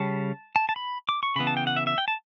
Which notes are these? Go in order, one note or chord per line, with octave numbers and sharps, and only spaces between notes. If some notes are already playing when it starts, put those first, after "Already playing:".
Already playing: C#3 G3 C#4 A5
A5
A5
B5
D6
C#6
C#3 E3 B3 B5
A5
G5
F#5
E5
E5
G5
A5